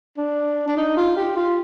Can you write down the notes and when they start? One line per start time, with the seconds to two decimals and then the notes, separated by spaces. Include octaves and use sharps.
0.17 D4
0.68 D4
0.77 D#4
0.96 F4
1.16 G4
1.36 F4